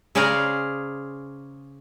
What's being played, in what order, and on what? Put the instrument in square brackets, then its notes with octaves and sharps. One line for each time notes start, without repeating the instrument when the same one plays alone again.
[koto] C#3 G#4 C5 D5 F5 A#5